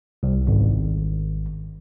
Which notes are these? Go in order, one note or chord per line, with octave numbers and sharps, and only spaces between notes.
C2
G#1